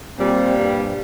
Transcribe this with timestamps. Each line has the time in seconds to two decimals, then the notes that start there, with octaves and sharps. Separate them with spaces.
0.19 A#2 G3 C4
0.58 G2